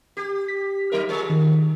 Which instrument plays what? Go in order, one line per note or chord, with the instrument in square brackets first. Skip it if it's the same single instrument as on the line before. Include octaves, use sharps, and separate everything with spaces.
[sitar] G4
[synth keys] B6
[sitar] F#3 D#4 A#4
F3 G#4
[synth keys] D#3